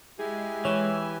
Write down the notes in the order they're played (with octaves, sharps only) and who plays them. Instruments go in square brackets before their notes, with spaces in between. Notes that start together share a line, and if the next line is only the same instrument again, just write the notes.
[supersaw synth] G#3 [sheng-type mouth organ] E4 G4 G#5
[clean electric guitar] E3 [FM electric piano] C#5